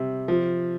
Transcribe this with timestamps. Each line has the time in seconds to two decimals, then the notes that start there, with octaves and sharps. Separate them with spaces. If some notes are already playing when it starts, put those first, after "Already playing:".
Already playing: C3 G3
0.28 F3